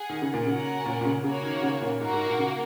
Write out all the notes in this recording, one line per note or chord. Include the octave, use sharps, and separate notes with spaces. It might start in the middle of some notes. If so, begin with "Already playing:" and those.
Already playing: G#4 F#5
D#3
C#3
A#2
C#3 C#4 F#4 A#4 F#5
A#2
A#2
C#3
C#3 A#3 F#4 C#5
D#3
C#3
A#2
G#2 A#3 F#4 A#4
G#2
A#2
C#3